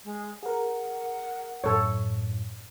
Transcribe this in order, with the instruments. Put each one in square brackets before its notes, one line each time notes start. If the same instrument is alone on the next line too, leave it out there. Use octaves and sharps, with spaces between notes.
[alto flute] G#3
[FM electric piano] G#4 A#4 [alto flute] F#5
[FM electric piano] F#2 A2 [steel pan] A4 C#5